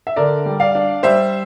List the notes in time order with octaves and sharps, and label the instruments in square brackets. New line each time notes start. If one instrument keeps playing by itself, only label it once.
[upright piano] E5
D3 A#4 D5
G3
D5 F5
D4
G3 C5 E5